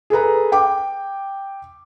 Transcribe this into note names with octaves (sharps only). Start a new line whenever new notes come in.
G#4 A4 B4 A#5
G5 D6